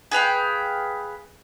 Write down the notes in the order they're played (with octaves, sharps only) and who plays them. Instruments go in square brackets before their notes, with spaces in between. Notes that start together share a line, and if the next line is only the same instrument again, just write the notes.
[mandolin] G#4 B4 F5 G5